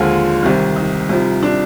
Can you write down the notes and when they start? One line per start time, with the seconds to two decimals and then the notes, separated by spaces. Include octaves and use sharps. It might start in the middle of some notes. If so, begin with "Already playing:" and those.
Already playing: D#2 D3 F3 G#3 F4
0.43 C2 C3 D#3
0.76 D#4
1.09 C2 C3 F3
1.43 D4